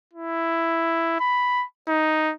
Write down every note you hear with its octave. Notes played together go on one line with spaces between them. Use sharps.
E4
B5
D#4